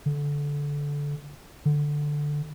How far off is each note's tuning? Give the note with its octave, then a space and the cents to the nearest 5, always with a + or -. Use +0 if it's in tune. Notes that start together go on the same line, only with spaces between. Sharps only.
D3 -20
D3 +5